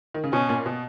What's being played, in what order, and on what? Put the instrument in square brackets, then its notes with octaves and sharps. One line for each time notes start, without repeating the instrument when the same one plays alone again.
[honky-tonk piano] D#3
C#3
[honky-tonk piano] B2 [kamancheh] C#4
[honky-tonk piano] A#2
B2